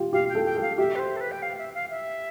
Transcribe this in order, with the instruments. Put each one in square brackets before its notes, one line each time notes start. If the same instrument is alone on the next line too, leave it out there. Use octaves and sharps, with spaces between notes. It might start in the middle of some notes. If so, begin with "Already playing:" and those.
Already playing: [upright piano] F4 G4
[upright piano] G4 [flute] F5
[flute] G5
[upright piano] A4
[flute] G5
[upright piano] A4
[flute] F5
[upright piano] G4 [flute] E5
[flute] B4
C5
A4
B4
G5
F5
E5
F5
E5